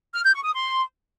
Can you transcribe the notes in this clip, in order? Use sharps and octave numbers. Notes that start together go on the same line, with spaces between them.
F6
G6
C#6
D#6
C6